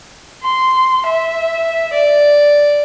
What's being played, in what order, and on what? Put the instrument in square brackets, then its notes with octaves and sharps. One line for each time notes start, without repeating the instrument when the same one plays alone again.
[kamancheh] C6
E5
D5